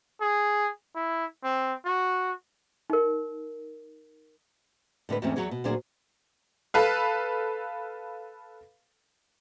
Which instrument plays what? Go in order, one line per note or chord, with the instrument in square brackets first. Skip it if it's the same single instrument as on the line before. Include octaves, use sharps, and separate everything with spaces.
[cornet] G#4
E4
C4
F#4
[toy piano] D#4 A#4
[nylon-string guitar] A2 D3 G#3 B4
E2 G#2 E3 A3 C4 C#4
E2 A#2 F#3 F#4 G#4 C#5
B2
D2 A#2 F#3 D4 G#4 C5
[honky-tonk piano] A4 B4 F5